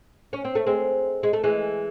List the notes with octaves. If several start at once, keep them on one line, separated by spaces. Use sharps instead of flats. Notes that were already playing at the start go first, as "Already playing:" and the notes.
C#4
C4
A3
G#3 C4
G#3
A3
E3 G#3